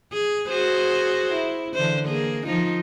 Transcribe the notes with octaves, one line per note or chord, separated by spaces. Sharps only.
G#4
F#4 G#4 C5
E4
D3 E3 C5
A#3 G#4
F3 D#4 F4